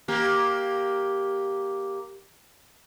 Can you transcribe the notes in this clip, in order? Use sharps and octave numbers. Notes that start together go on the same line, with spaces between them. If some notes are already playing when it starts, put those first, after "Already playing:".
A#3 G4